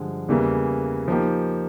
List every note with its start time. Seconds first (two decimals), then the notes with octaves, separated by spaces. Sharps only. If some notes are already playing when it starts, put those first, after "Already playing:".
Already playing: G2 D3 F3 G#3
0.29 E2 C#3 E3 G3 A#3
1.08 F3 A#3 D#4 G4